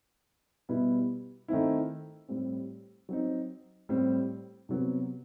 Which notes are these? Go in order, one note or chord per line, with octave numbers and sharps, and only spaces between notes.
B2 G3 B3 E4
D#3 A3 C4 E4
A2 G3 C4
F#3 C4 D#4
A2 G3 C4
C3 F#3 B3